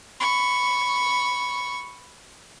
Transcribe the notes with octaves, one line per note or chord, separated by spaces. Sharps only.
B5 C#6